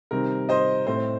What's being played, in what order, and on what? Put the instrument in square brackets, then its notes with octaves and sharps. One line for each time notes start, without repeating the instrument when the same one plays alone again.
[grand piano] C3 D#3 G3 C4 A#4
C5 D#5
A2 A3 C4 C5